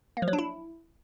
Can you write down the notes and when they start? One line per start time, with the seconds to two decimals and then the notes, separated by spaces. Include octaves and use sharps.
0.17 A#3
0.22 F3
0.28 F#3
0.33 D4
0.39 E4